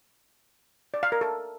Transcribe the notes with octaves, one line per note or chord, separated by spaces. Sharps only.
D5
F5
A#4
A4